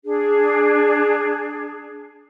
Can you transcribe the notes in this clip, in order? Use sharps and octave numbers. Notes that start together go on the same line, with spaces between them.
D4 G#4